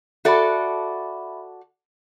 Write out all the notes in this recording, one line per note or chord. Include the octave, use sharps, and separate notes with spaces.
F#4 A4 D5 E5 B5